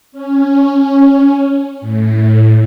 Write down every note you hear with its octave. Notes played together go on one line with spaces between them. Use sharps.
C#4
A2